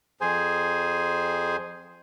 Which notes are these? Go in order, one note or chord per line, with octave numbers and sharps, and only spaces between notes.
F2 G#4 C5 G#5